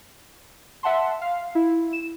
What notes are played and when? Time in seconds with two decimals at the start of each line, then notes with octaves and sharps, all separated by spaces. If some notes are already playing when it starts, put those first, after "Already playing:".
0.83 E5 F#5 A5 C6
1.22 F5
1.55 E4
1.93 E7